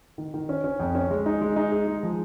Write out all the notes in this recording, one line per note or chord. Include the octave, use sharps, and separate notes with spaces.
D#3
D#3
C#4
C#4
F2
C#4
G#3
D#4
G#3
D#4
G#4
G#3
F3